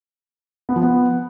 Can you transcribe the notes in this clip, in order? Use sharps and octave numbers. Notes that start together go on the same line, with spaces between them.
B3
F3
B3